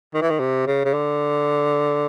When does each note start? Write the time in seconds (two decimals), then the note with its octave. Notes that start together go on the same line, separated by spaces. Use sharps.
0.14 D#3
0.22 E3
0.30 D#3
0.40 C3
0.66 C#3
0.85 C#3
0.93 D3